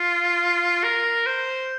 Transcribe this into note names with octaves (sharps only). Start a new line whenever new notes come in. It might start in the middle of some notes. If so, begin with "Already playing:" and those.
Already playing: F4
A#4
C5